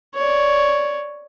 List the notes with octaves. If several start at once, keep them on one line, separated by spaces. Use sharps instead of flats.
C#5 D5